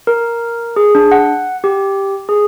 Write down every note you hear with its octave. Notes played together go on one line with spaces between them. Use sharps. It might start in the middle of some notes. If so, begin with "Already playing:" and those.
A#4
G#4
D4
F#5
G4
G#4